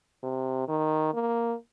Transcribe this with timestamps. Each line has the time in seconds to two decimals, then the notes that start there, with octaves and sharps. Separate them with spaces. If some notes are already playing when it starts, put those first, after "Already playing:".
0.23 C3
0.68 D#3
1.14 A#3